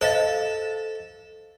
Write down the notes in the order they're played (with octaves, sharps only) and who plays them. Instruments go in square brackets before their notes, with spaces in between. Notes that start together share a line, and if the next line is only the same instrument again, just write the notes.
[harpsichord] A4 [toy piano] C5 D#5 F5